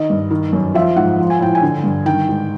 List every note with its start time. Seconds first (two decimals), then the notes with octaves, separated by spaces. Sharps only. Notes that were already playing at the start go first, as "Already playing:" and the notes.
Already playing: D#3 D#5
0.10 G2
0.31 D#3
0.53 F#2
0.74 F3 E5
0.96 G#2 F#5
1.19 F3
1.30 G#5
1.40 A2 G5
1.55 G#5
1.62 D3
1.84 G2
2.06 D#3 G5
2.29 G#2